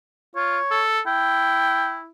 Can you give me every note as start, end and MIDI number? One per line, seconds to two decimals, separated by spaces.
0.36 0.59 65
0.36 0.81 73
0.71 1.00 69
1.06 2.11 64
1.06 1.97 79